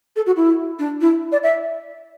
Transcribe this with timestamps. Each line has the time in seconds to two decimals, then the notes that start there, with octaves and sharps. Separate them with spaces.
0.16 A4
0.26 F#4
0.36 E4
0.79 D4
1.01 E4
1.32 D5
1.43 E5